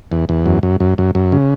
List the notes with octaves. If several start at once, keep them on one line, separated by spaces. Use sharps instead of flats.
E2
E2
F#2
F#2
F#2
F#2
F#2
C#3